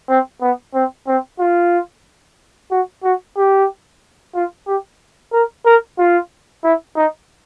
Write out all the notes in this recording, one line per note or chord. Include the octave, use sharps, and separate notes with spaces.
C4
B3
C4
C4
F4
F#4
F#4
G4
F4
G4
A#4
A#4
F4
E4
D#4